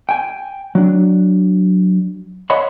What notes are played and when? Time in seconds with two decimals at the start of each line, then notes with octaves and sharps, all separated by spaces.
0.09 G5 G#5
0.75 F#3 D4
2.50 C#5 D#5 F5 F#5 B5 C6